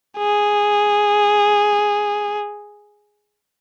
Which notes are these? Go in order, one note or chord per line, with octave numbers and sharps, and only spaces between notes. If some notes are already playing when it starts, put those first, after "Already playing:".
G#4